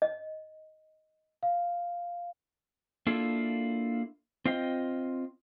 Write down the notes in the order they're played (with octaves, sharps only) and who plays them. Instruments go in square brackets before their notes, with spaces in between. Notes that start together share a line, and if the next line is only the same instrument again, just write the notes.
[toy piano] D#5
[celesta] F5
[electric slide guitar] A#3 D4 E4 F4 A4
C4 F4 D#5 G5